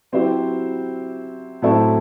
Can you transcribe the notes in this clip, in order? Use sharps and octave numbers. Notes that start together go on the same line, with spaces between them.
F#3 C4 E4 G4 C5
A2 F#3 C4 E4 A4